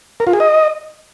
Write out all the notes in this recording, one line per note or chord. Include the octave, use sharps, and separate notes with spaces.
A#4
F4
G#4
D#5